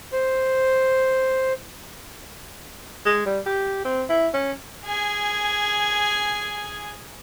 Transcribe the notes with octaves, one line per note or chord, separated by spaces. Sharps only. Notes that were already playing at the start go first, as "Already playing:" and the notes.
C5
G#3
G3
G4
C4
E4
C#4
G#4 G#5